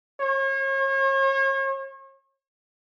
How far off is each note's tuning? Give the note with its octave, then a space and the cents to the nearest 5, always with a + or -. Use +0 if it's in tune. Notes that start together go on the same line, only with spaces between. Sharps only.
C#5 -40